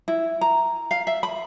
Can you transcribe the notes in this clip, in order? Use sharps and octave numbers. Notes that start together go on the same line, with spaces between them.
E4
A#5
F5
E5
B5